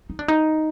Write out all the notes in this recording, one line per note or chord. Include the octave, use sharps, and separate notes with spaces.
D#4
D4
D#4